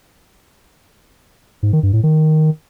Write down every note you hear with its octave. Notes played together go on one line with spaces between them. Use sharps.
G#2
D#3
G2
A2
D#3